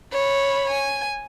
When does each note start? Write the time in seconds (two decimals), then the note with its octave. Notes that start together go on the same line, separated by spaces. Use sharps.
0.12 C#5 B5
0.70 G#5